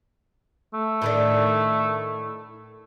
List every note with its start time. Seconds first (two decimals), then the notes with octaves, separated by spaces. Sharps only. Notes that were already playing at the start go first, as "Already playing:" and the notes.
0.74 A3
1.02 A2 D#3 D4